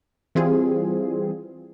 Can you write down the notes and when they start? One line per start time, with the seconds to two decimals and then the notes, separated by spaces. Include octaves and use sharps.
0.35 E3 G3 C4 F4 G#4